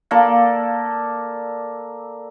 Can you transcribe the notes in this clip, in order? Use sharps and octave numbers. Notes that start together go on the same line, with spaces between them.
A#3 A4 D5